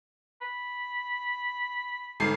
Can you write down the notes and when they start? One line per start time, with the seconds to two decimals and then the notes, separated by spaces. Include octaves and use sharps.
0.41 B5
2.20 G1 G#2 C7